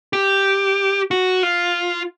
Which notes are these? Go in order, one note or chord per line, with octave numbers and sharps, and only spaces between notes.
G4
F#4
F4